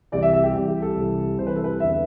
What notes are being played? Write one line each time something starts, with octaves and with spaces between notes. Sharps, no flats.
C2 C3 E3 D5
E5
E5
G4
C2 C3 E3 G4
G4
A4
C2 C3 E3
C2 C3 E3 C5
B4
A4
B4
E2 D3 E5